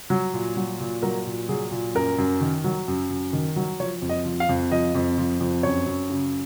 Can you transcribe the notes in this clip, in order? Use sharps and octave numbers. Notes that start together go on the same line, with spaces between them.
F#3
A#2
F#3
A#2
F#3 A#4
A#2
F#3 G#4
A#2
F#2 A#4
F#2
D#3
F#3
F#2
F#2
D#3
F#3
F3 C#5
F2
D#5
F3
F5
F2
F3 D#5
F2
F3
F2
F#2 C#5
F#2
C#3